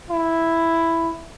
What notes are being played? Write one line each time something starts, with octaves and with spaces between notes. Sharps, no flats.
E4